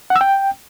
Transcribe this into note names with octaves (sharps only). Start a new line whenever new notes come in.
F#5
E6
G5